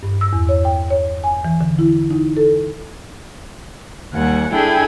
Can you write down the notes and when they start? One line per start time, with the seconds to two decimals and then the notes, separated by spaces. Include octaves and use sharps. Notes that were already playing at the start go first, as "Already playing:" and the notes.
0.03 G2
0.21 E6
0.33 E2
0.49 C#5
0.65 G5
0.90 C#5
1.24 G#5
1.45 E3
1.61 D3
1.79 E4
2.11 D#4
2.37 A4
4.14 D#2 G3 F#5 G#5
4.52 D4 E4 G#4 A4 G5 G#5